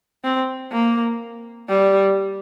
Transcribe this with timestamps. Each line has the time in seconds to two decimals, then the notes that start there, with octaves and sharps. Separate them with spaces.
0.24 C4
0.72 A#3
1.69 G3